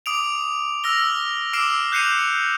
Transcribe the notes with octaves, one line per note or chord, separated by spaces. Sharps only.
D6 D#6 D7 F7
E6 F6 A#6 F7 G7
D6 E6 F6 C7 D7 E7
F#6 G6 C7 C#7 D#7 F7